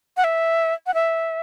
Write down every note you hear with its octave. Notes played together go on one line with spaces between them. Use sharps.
F#5
E5
F#5
E5